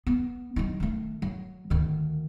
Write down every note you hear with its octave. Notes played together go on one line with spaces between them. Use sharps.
B3
F#3 D#4
D#3 A3
F#3
D2 D#3